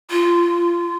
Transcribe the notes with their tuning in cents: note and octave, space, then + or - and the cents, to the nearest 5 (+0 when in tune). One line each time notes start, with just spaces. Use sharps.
F4 -20